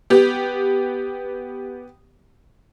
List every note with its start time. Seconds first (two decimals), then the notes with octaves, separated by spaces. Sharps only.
0.10 B3 G4